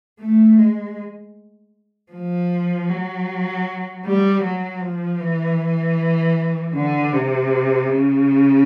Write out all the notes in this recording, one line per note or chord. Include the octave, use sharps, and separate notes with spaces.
A3
G#3
F3
F#3
G3
F#3
F3
E3
D3
C3
C#3